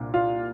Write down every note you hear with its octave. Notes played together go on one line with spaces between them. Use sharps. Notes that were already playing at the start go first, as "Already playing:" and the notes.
Already playing: C2 A#2 A#3 D4
F4 F5